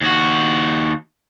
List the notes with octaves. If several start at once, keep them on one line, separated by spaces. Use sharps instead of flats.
D#2 F#4